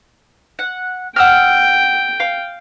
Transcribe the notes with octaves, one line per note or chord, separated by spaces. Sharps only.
F#5
F#5 G5 E6 F6
F5